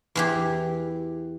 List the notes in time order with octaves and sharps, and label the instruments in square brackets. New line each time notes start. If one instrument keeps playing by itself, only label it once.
[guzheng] E2 E3 G4